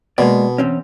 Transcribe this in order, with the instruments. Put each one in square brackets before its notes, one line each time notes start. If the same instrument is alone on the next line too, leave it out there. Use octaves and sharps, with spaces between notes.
[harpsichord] B2 [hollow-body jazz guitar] G#3 A#3 D5
[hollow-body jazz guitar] E2 C4 C#4